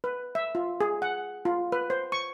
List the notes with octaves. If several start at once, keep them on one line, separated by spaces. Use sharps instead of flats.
B4
E5
F4
G#4
F#5
F4
B4
C5
C#6